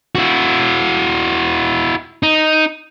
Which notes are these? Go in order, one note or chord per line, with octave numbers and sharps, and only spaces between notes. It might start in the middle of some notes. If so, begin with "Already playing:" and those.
E4 F#4
D#4